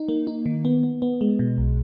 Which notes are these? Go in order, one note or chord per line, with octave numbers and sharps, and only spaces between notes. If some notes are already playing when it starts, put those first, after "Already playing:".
Already playing: D#4
A#3
D#4
D#3
B3
B3
B3
G#3
B2
B1